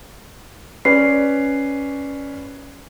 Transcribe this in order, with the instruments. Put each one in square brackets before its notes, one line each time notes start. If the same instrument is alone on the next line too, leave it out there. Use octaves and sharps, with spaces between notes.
[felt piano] C#4 B4 D5 [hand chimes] C7